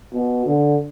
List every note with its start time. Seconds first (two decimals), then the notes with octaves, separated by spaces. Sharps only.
0.13 B2
0.46 D3